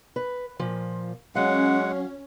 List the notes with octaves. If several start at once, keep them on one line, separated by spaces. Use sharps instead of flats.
B4
A#2 F3
F#3 G#3 C#4 F5 F#5